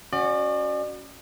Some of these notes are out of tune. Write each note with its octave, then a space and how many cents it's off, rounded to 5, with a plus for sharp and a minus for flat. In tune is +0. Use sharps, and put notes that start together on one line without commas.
C#4 +0 F#4 +0 D5 +40